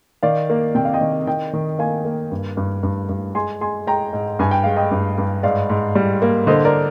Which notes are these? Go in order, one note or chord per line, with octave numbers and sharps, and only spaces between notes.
D#3 D5 F5
A#3
C3 G5
F5
D#5 G5
D#3
D#3 D#5 G5
D#3
A#3 F5 G#5
A#3
G2
G2
G2
G2
G#3 G#5 C6
G#3 G#5 C6
G#3 G5 A#5
G#2
G2 G#5
G5
G#3 F5
D#5 G5
G2
G2
G#2 D5 F5
G#2
G3
A#3
D3 C5 D#5
A#4 D5